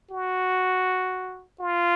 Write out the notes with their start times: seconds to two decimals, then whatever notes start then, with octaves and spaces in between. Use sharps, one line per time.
0.11 F#4
1.60 F4